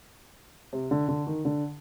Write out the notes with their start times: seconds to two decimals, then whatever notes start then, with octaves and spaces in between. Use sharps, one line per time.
0.73 C3
0.91 D3
1.08 D3
1.27 D#3
1.45 D3